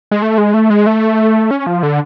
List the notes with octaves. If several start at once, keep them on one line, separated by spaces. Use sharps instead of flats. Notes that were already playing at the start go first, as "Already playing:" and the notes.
G#3
A3
G#3
A3
G#3
A3
C#4
F3
D3